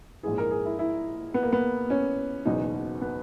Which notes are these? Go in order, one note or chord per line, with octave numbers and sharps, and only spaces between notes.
A#1 G#2 E3 G#4
A#4
G#4
E4
E4
B3
A#3
B3
C#4
F#1 E2 B2 F#3 D#4
B3